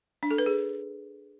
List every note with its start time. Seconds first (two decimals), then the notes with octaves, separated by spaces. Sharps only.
0.23 D4
0.31 A4
0.38 B4
0.46 G#4